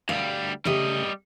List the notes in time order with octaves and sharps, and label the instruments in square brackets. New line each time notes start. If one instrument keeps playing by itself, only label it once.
[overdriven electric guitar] D2 G3 [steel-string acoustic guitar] F5
[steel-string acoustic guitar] C#3 A3 G4 [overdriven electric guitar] G3 D#5